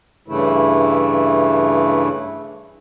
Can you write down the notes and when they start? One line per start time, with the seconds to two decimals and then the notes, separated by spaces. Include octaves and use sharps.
0.28 G2 C#3 E3 A3 E4